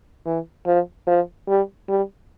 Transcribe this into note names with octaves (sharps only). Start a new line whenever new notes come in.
E3
F3
F3
G3
G3